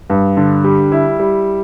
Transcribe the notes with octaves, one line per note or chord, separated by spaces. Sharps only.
G2
D3
G3
E4
G3